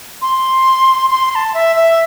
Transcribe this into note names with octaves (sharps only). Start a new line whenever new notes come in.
C6
C6
C6
A5
E5
E5